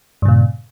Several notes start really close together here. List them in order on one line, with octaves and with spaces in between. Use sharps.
G2 C#3 A#2